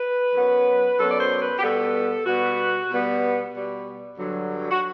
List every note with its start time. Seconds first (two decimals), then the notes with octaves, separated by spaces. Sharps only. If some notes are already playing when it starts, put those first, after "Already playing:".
Already playing: B4
0.34 F#2 F#3 B3
0.99 F#2 F#3 B3 A4
1.10 D5
1.20 C5
1.42 B4
1.59 G4
1.62 B2 G3 B3 A4
2.25 B2 G3 B3 F#4
2.90 B2 G3 B3
3.54 B2 G3 B3
4.17 G2 D3 F#3
4.70 F#4